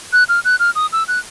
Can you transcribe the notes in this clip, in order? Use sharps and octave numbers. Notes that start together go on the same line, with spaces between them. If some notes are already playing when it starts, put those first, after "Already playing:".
F#6
F6
F#6
F6
D#6
E6
F#6